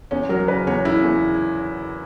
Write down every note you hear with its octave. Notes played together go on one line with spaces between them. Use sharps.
E2 C#4
F#3 A#4
C#3 B4
E2 C#5
C#3 E4
E2